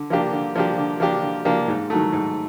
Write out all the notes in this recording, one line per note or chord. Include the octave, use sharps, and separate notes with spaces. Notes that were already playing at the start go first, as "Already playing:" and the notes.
Already playing: D3
F3 A#3 D4 G4
D3
F3 A#3 D4 G4
D3
F3 A#3 D4 G4
D3
F3 A#3 D4 G4
G#2
D#3 F#3 A3
G#2